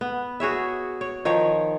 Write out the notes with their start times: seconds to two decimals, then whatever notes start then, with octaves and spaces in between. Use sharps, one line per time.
0.01 B3
0.40 F#4 G#4 C#5 E5
1.01 C#5
1.25 D#3 F3 C#5